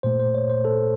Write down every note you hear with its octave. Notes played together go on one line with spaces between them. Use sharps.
A#2 A3 C5
C5
C#5
C5
A4